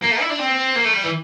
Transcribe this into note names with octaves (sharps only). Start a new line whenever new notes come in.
A#3
A3
E4
D4
C4
A#3
A3
G3
E3